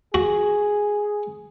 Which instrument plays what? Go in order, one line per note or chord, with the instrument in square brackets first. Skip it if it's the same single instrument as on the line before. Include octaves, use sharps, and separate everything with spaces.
[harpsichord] F#4 [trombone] G#4